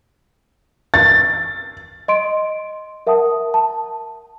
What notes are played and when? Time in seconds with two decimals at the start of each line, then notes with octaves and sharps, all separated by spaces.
0.94 A6
2.08 D#5 C6 D7
3.07 A#4 E5 F#5 A5 D#6
3.54 A5